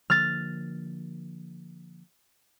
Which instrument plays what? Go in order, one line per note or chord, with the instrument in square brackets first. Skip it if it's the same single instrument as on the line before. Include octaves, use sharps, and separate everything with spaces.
[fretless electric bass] D3 F3 A#3 [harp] F6 A6